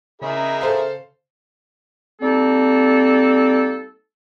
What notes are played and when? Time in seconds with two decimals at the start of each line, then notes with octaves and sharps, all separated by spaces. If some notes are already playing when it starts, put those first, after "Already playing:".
0.22 C#3 D#4 E4 G#4 A#4 E5 A#5
0.61 A4 C5 F5
2.22 G3 A#3 C4 D#4 A4